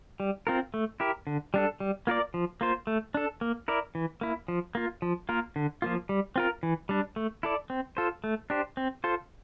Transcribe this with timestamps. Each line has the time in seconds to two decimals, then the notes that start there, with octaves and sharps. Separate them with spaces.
0.20 G3
0.47 C4 F4 A#4
0.74 A3
1.00 E4 G4 A#4
1.27 D3
1.54 G3 D4 A4
1.80 G3
2.07 A#3 F4 A#4 D5
2.34 F3
2.61 A#3 F4 C5
2.87 A3
3.14 D4 A4
3.41 A#3
3.68 E4 A#4 D5
3.95 E3
4.21 A#3 E4
4.48 F3
4.75 A#3 F4
5.02 F3
5.29 A#3 F4 A#4
5.56 D3
5.82 F3 A#3 F4
6.09 G3
6.36 C4 F4 A#4
6.63 E3
6.89 G3 D4
7.16 A3
7.43 E4 A4 D5
7.70 C4
7.97 F4 A4 C5
8.24 A3
8.50 D4 G4 C5
8.77 C4
9.04 F4 A4 C5